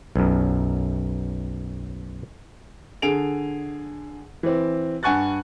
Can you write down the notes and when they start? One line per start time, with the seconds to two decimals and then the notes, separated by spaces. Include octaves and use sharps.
0.16 B1 F#2
3.02 D3 G#4 D7 F7
4.43 E3 C4
5.03 G2 F#5 G#5 C#6 F#6 A6